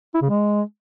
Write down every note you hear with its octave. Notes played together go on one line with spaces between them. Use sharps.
E4
C#3
G#3